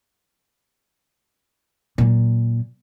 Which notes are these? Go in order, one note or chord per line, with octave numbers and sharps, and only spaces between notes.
A#2 F#3